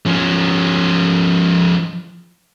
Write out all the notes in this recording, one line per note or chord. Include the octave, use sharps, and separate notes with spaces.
F3 C#4